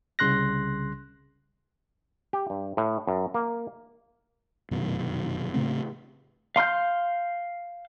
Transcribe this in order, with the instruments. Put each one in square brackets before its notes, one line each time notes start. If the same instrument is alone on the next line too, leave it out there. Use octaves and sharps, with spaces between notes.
[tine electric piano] C2 C#3 C6 F#6 A#6
[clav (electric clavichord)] G4
G2
A2
F#2
A#3
[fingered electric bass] F1 F#2 B2 D#3
A2 C#3 A3 C4
[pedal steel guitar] F5 C6 F6 G6